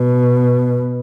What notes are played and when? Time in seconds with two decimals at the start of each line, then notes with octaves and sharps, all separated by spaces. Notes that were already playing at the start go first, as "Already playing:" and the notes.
Already playing: B2